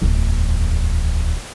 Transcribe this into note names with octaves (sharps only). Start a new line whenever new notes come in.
D1 E2